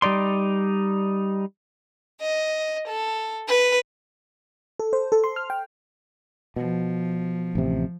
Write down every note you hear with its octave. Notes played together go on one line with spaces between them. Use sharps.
G3 D#4 D5 C6
D#5
A4
B4
A4
C5
A4
C6
F6
G5
B2 F3
A1 C3